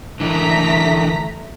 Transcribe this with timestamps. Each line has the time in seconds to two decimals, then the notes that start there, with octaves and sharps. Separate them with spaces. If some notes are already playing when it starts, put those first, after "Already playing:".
0.20 D3 E3 A3 A#4 A#5 B6